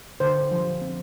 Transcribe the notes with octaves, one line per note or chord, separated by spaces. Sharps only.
D3 C5
F3
C4